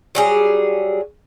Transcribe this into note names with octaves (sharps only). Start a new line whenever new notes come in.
F#3 G3 G#4